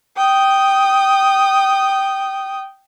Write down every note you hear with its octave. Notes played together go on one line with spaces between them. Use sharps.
G5 D#6